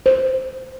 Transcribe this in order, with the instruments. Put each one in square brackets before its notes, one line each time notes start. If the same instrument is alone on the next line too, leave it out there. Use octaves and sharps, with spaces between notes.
[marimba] C5